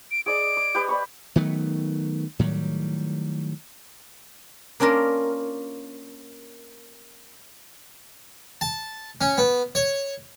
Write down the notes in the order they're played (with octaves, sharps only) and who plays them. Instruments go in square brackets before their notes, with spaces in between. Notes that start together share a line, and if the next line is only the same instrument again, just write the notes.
[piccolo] D7
[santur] G#4 D5 D#5 [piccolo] D7
[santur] D6
G4 B4 D#5
D5 B5 C#6
[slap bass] D#3 F#3 A3 B3
A2 D#3 F#3 G3
[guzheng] A#3 C#4 D4 F4 A#4
[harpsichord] A5
C#4
B3
C#5